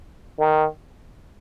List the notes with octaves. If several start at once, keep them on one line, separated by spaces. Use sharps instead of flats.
D#3